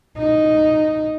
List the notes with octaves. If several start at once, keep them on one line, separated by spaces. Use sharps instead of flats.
D#4